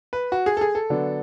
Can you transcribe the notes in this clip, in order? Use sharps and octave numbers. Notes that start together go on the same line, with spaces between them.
B4
F#4
G#4
A4
G#4
A4
D3 F#3 B3 D4